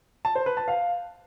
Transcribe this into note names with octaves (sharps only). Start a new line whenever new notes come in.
A5
C5
B4
A5
F5